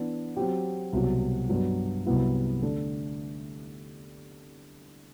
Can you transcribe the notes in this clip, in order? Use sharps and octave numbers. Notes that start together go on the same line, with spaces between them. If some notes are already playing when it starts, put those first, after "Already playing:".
Already playing: E3 B3 D4
F#3 C4 G4
C2 B2 F#3
G2 F#3 B3
C2 C3 F#3 B3 E4
D3 A3 D4 A4